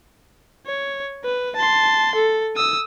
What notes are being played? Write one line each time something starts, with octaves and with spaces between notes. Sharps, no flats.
C#5
B4
A5 C6
A4
D#6 E6